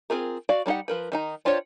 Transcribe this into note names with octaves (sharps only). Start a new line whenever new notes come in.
C4 C#4 F4 G#4 A#4
F#4 D5 F5
G3 D4 D#4 G4 F#5
F3 A#4 B4
D#3 D#4 A#5
D4 F4 G4 C5 C#5